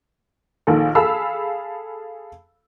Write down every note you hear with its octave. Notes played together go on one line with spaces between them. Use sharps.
A#1 D#3 A4
G#4 A4 F5 A5 B5 E6